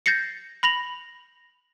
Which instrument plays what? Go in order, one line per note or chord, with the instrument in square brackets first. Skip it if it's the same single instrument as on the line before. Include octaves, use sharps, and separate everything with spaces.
[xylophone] G6 A6 A#6 C7 C#7
B5 A#6 F7 F#7